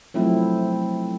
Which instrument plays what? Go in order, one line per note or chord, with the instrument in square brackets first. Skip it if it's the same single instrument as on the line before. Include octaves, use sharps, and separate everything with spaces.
[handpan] F3 F#3 A3 C4 E4